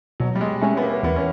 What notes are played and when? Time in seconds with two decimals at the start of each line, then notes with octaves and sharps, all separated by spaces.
0.20 B2 F#3
0.36 G3
0.41 G#3
0.61 G#3 A3 C#4
0.77 B3
0.82 A#3
1.03 E2 B3
1.16 C#4